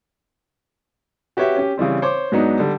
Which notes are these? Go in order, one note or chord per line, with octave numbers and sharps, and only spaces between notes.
F#4 G4 B4 C#5 E5
C#4 G4
C#3 E3 G3 C4
C5 C#5 C6 D6
G#2 F#3 B3 D4 D#4
D3 G3